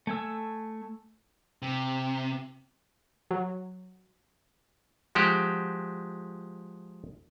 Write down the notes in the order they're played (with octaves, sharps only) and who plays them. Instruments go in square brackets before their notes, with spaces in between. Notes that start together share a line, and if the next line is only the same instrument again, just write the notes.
[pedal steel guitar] A3 G#5 E6
[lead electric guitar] C3
[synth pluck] F#3
[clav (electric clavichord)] F3 G#3 F#4 G4